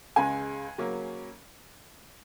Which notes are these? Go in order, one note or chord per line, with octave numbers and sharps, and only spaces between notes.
C#2 C#3 G#3 G#5
C#3 F#3 A#3 C#4